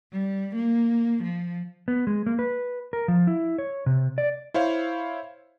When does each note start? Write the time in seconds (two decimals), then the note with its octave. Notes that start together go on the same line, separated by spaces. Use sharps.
0.12 G3
0.55 A#3
1.23 F3
1.88 B3
2.07 G#3
2.26 A#3
2.39 B4
2.93 A#4
3.08 F3
3.27 E4
3.58 C#5
3.86 C3
4.18 D5
4.54 E4 C5 C#5 F5